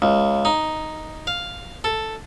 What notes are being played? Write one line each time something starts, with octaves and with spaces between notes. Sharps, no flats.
C#2
D#4
F5
A4